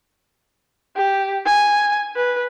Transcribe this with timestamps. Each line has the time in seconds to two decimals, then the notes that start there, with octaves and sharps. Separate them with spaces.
0.96 G4
1.46 G#5
2.15 B4